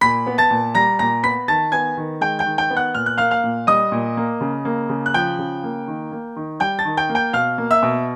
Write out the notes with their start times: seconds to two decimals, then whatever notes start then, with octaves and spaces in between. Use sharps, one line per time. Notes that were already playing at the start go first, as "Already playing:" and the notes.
0.01 A#2 B5 B6
0.27 B3
0.38 A5 A6
0.51 A#2
0.75 G3 A#5 A#6
0.99 A#2 A#5 A#6
1.23 B3 B5 B6
1.48 D#3 A5 A6
1.72 B3 G#5 G#6
1.97 D#3
2.21 G#3 G5 G6
2.39 G5 G6
2.46 D#3
2.58 G5 G6
2.70 B3
2.76 F#5 F#6
2.95 A#2 F6
3.06 F#6
3.18 A#3 F5 F6
3.31 F5 F6
3.44 A#2
3.67 G3 D#5 D#6
3.92 A#2
4.17 A#3
4.41 C#3
4.65 A#3
4.89 C#3
5.06 F#6
5.14 F3 G5 G6
5.39 C#3
5.64 A#3
5.88 D#3
6.12 A#3
6.36 D#3
6.60 G3 G5 G6
6.79 A5 A6
6.85 D#3
6.97 G5 G6
7.09 A#3
7.15 G5 G6
7.33 B2 F5 F6
7.58 A#3
7.71 E5 E6
7.83 B2